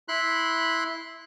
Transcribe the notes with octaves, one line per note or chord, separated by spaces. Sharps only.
E4 B5 C6 F#6